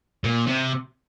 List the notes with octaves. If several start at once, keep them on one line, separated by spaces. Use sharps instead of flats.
A#2
C3